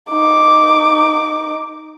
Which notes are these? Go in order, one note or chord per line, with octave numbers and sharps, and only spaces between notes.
D#4 D6